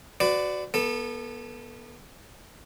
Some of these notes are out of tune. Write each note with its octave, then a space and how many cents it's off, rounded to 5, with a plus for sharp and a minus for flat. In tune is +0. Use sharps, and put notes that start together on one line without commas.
F#4 +0 B4 +40 D5 +0
B3 -30 A4 +0